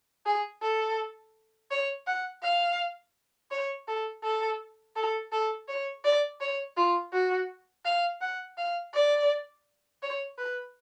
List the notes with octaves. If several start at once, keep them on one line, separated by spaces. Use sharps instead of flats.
G#4
A4
C#5
F#5
F5
C#5
A4
A4
A4
A4
C#5
D5
C#5
F4
F#4
F5
F#5
F5
D5
C#5
B4